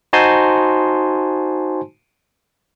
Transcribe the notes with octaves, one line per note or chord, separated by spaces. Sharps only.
D#4 F#4 C5 G#5 A5 C6